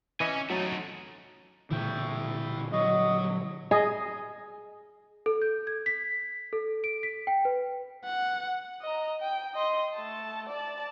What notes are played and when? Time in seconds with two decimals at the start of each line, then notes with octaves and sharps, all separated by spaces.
0.20 E3 C#4 D#5 E5 G#5
0.50 F#3 A3 D#4 A6
1.71 A#2 D3 E3 E4 G5
2.73 F#3 D#5
3.71 G#4 D#5
5.26 A4
5.42 G6
5.67 G#6
5.86 B6
6.53 A4
6.84 D7
7.03 B6
7.27 G5
7.45 B4
8.05 F#5
8.82 D#5 A#5
9.21 G5
9.55 D#5 C6
9.95 A3 A5
10.49 D5 A5